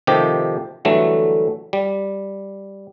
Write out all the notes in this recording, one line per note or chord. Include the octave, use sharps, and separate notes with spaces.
C3 D#3 F3 A3 D#4 G4
D3 E3 F#3 G3 A3
G3